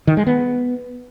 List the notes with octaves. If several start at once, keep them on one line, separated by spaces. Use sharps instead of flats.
D#3
G#3
B3